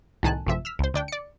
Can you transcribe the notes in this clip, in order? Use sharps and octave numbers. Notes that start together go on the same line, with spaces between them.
C2 A2 D#3 G#5 A5 F#6
A1 F#2 C3 F3 E5
E6 F6 B6
C#2 C5
D2 D4 G5
D5 C#7